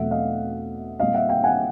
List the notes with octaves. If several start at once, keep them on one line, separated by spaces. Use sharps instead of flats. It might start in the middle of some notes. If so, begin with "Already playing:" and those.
Already playing: E2 B2 F#3 A3 C4 E5 F#5
D#5 F5
A#2 G3 C4 D#5 F5
E5 F#5
F5 G5
F#5 G#5